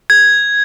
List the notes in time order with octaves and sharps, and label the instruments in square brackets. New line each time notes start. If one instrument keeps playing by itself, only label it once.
[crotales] G#6